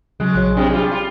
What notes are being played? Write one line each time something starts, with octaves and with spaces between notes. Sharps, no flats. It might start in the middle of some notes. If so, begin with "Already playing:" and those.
C#3 F#3 G#3
A#1 F#3 C#5
C3 G3 G#3 D4
G3 F4 G#4
F4